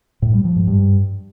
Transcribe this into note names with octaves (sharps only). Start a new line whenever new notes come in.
A2
G3
F3
G#2
G2